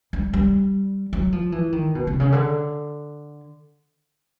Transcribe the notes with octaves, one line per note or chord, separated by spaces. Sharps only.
G3
G3
F#3
F3
E3
D#3
B2
C3
C#3
D3